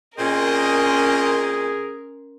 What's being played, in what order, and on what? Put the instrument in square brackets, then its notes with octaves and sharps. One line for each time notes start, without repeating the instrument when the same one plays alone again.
[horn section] A#2 C4 D#5 [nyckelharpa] C#4 C6 [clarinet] G#4 [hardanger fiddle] A#4